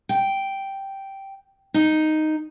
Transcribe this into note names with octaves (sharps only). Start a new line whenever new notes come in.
G5
D#4